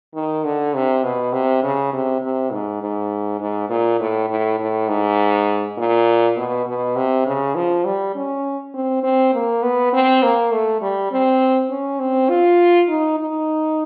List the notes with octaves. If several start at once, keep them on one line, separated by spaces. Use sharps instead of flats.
D#3
D3
C3
B2
C3
C#3
C3
C3
G#2
G#2
G#2
A#2
A2
A2
A2
G#2
A#2
B2
B2
C3
C#3
F3
G3
C#4
C4
C4
A#3
B3
C4
A#3
A3
G3
C4
C#4
C4
F4
D#4
D#4